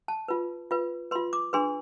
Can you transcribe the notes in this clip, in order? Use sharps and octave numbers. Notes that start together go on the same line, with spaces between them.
A5
F4 B4
F4 B4
F4 B4 C6
D6
D4 G#4 B4 C6